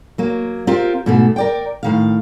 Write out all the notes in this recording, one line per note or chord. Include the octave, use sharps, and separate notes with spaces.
F#3 A#3
C4 F4 G4 A#4
G#2 B2 A3
A#4 D5 G5
A2 D#3 F5